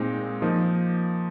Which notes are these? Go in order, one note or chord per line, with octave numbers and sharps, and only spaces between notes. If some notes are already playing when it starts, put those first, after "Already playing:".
Already playing: A#2 G#3 C4 D#4
F3 A#3 D#4